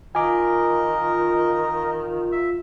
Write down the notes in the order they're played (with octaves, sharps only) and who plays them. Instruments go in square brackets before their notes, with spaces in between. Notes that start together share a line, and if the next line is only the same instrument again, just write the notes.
[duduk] D#3 [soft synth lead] F4 [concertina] A#4 D#5 [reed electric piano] G#5 D6
[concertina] E5